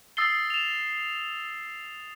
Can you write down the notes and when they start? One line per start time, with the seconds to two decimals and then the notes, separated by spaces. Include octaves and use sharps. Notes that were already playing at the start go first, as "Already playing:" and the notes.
0.17 D#6 E6 A6 C7 G7
0.50 E7 F7